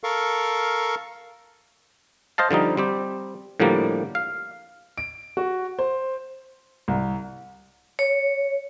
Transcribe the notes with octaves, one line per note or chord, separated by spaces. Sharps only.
A4 A#4 F5 C#6
C5 D#5 F5 A5
D3 F3 G3 D#4
G3 C4 G4
A2 D3 F3 G3 A#3
F5
D7
F#4
C5
C2
C#5